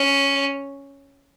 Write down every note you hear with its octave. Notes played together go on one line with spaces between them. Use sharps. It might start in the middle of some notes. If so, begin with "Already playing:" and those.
Already playing: C#4